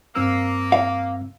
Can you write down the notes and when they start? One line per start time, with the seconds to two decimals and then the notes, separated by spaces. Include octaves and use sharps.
0.16 G2 A#3 C4 E6
0.72 F5